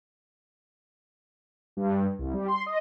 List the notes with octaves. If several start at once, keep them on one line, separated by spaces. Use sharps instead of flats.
G2
C2
G3
C6
D#5